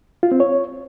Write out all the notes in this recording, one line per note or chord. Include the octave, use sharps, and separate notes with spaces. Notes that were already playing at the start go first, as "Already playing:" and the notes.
F4
C4
C#5